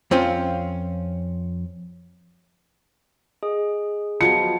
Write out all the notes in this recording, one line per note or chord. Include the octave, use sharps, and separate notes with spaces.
F2 C4 C#4 F4
G#4 D#5
F3 F#3 B3 D#5 A5 C#7